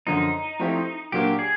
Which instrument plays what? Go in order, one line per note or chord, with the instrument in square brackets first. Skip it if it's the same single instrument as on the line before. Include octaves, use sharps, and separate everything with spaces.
[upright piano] F#2 D3 F3 [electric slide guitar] D#4
[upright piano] F3 A3 C4 E4 G4
[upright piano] A#2 F#3 A#3 D4 [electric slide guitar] G4
[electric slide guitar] G#4